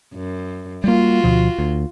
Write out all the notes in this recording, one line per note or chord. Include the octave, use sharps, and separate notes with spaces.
F#2
G3 A#3 F4 F#4
D2 B2 F3
D2